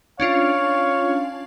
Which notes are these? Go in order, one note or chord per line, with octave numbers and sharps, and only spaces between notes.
C#4 D4 F4 C#5 F5